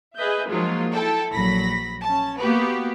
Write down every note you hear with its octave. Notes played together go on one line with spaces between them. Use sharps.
G#4 B4 D#5 E5 G6
F3 F#3 G#3 A#3 D#4 F4
E4 A4 G5 A5
A#1 F#3 B5 A#6 B6
C#4 A5
A#3 B3 F#4 G4 B4